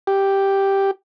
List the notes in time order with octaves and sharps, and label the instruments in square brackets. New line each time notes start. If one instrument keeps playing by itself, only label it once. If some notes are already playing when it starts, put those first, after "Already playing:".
[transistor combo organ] G4